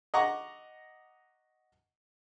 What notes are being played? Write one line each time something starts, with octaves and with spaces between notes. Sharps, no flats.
D#5 F#5 A#5 C#6 D6